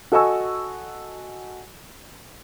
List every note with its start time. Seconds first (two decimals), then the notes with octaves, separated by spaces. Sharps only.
0.12 F#4 A4 D#5 G#5 C#6 E6